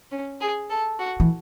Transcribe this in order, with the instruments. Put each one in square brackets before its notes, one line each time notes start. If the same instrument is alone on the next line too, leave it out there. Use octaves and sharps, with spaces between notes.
[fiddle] C#4
G#4
A4
F#4
[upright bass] E3